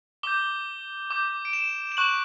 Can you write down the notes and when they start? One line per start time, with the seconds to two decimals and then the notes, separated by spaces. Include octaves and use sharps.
0.23 D6 G6 G7
1.10 D6 G6
1.45 D7
1.53 E7
1.92 E7
1.97 C#6 F#6 F#7